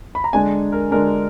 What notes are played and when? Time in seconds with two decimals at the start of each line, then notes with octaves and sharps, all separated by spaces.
0.15 B5
0.24 A#5
0.33 D3 G#3 D4 G#5
0.72 A#4
0.91 D3 G#3 D4 A#4